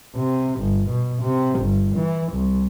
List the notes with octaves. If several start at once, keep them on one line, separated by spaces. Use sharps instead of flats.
C3
G1
B2
C3
G1
E3
C2